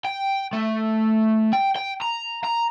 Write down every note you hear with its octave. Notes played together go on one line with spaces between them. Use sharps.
G5
A3
G5
G5
A#5
A#5